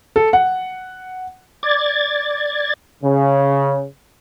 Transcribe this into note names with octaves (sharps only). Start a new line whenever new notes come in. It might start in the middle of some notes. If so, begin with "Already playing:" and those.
A4
F#5
D5 G#6 A6
C#3